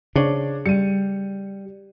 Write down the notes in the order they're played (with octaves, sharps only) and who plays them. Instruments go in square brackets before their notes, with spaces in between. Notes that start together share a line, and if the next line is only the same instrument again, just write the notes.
[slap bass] C#3 [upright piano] D4 C5 C#5
[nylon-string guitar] G3 [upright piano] C#7 D#7